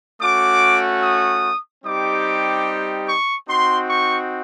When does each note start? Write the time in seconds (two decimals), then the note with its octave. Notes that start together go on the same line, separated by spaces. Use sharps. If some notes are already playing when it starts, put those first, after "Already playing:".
0.20 A3 C#4 F#4 D6
1.01 D#6
1.84 G3 C4 D#4 G4 D6
3.06 C#6
3.47 C4 D#4 F#4 C6
3.89 C#6